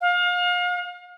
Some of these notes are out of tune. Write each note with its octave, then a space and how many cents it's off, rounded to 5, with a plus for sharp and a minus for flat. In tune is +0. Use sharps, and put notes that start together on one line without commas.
F5 +35